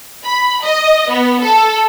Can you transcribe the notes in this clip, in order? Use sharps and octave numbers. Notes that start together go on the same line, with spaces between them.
B5
D#5
B3
A4